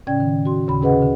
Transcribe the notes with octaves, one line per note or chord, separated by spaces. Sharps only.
A2 C#3 C#4 D5 G5 G#6
D#3
F#4 C6
D#2 C#3 B5
C3 C#4 G#4 B4 D#5 F#5
D3